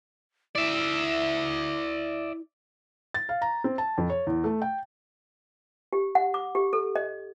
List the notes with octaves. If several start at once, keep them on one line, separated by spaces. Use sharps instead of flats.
E4 D5 E5
A6
F5
A#5
C4
A5
F2
C#5
E2
A3
G5
G4
F#5
D6
G4
A4
D#5